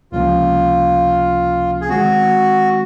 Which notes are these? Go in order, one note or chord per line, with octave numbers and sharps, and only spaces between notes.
C#2 C3 F3 A#3 C#4 F4
G#4
D#3 G#3 C4 F#4